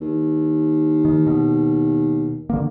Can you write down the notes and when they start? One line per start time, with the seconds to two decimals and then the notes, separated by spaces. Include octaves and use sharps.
0.01 D#2
1.05 D#3
1.27 B2
2.50 D3 D#3 A#3